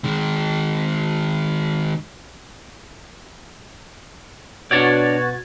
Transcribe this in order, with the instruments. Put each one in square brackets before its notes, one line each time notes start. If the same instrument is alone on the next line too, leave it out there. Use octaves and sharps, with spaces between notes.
[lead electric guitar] D#3 G#3
[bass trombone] B2 [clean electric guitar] D4 C#5 D5 [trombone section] F#4 [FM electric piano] G#6 A6